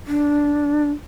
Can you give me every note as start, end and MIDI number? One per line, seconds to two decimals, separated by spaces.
0.07 0.90 62